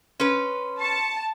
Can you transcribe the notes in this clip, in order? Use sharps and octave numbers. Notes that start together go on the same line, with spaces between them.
C#4 B4 C6
A5 C#6